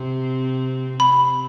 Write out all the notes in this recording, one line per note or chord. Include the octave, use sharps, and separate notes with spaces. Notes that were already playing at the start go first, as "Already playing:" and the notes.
Already playing: C3 C4
C3 C4 B5